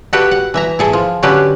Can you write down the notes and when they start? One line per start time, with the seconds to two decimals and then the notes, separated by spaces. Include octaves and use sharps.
0.13 F#4 G4 A4 B4 F#5 G5
0.31 F#5
0.54 E3 E5 A#5
0.79 E4 G#4 A4
0.93 F3
1.23 D3 F#3 C#4 D4 G4 B4